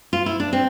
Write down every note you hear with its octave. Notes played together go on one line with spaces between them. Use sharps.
F4
E4
D4
C4